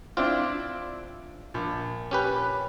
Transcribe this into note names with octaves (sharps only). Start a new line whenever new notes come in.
C4 D4 E4 F4
A#1
C#4 G4 B4